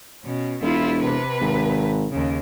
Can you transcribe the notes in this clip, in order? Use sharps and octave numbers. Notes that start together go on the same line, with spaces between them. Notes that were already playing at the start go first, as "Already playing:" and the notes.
B2 C#4
E1 E4 F4
C3 B4
G#1
D#2 C#3